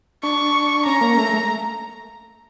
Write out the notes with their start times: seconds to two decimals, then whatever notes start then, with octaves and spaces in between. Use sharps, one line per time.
0.23 D4 C#6
0.85 C#4 A#5
1.01 A#3
1.18 A3
1.33 A3